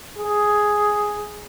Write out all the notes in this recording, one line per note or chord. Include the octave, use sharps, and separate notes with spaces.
G#4